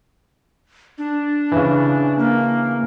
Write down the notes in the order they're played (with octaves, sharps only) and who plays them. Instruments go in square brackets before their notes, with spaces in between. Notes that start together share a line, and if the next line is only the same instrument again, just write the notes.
[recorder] D4
[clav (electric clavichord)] C#3 E3
[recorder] A#3